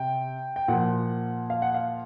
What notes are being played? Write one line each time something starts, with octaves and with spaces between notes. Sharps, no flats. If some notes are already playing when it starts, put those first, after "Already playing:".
Already playing: C3 G5
G5
A#2 F3 F#5
F5
F#5
F5